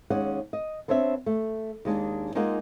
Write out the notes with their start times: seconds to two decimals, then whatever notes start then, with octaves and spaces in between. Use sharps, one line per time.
0.10 D#2 G#3 C#4 D5 F#5
0.53 D#5
0.88 B3 C4 D4 C#5 E5
1.26 A3
1.85 D#2 G#3 D4
2.35 G#3 A#3 D#4 F4 G#4 F#5